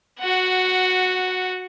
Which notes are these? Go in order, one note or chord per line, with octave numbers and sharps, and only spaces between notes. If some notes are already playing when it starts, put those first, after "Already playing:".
F#4 F#5